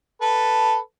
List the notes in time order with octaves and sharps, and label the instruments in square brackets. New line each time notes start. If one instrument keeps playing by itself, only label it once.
[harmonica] A4 B4 A5